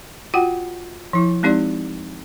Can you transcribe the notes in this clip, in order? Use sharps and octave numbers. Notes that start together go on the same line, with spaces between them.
F4 F#4 F#5 G5
F3 E4
G#3 C4 D#4 G4 D5 C6